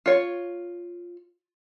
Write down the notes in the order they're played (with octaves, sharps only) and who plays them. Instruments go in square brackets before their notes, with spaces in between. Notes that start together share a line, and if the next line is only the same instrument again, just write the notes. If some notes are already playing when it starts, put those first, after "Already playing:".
[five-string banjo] F4 C#5